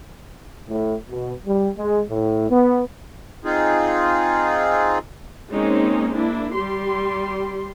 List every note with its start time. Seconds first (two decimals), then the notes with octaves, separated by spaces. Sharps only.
0.68 A2
1.10 B2
1.46 G3
1.77 G#3
2.09 A2
2.49 B3
3.45 C4 D#4 F4 G#4
5.50 G#3 A#3 C4 C#4 D#4
6.14 A#3 D4 E4
6.53 G3 G4 C6